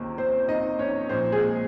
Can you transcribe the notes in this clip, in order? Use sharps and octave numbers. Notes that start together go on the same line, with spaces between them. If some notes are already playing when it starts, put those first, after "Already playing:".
Already playing: C#2 C3 D#3 A#3
C4 C5
D#4 D#5
C#4 C#5
A#2 F3 C4 C5
G#3 G#4